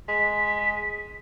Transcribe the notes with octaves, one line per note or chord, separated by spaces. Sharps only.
G#3 B6